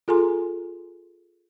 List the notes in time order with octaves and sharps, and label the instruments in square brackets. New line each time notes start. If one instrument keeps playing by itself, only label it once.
[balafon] F4 G#4 A4 G#5 A#5 C6